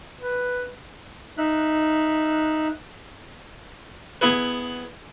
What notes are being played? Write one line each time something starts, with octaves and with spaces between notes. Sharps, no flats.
B4
D#4 E5 F#6
B3 E4 G#4 B4